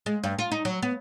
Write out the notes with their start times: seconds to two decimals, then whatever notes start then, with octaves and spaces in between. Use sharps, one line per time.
0.06 G#3
0.23 G2
0.39 F4
0.52 D#4
0.65 F#3
0.83 B3